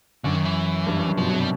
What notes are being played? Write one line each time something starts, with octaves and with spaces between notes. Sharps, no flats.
F#2 D3
D#3
E3
G2
F#2
F#2
B2 F3
F#3
C3
G3